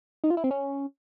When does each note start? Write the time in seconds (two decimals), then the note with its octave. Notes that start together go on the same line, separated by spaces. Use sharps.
0.24 D#4
0.30 F4
0.37 E4
0.44 C4
0.51 C#4